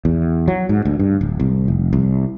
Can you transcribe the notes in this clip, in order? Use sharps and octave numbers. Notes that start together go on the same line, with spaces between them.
E2
F#3
G#2
D2
G2
D1
C2
F1
C2